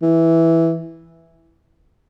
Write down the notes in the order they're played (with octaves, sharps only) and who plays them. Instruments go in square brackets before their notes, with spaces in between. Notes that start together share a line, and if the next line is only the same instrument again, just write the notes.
[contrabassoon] E3